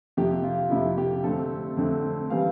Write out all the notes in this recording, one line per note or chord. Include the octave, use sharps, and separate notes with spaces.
F2 C3 F3 G4
F4
F2 C3 F3 E4
G4
F2 D3 A3 C4 A4
F2 D3 A3 C4
E3 G3 C4 F5